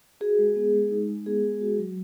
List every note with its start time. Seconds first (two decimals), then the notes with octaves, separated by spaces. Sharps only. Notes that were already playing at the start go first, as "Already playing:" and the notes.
0.21 F#4 G#4
0.38 G#3
0.56 B3
0.74 G#3
0.91 D#4
1.08 G#3
1.26 B3 G#4
1.44 G#3
1.61 F#4
1.79 F#3